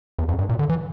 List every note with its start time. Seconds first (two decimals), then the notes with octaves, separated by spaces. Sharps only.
0.19 E2
0.29 F2
0.39 G2
0.49 A#2
0.59 D3
0.69 E3